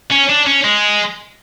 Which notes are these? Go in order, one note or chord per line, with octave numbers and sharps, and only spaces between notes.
C#4
D4
C#4
G#3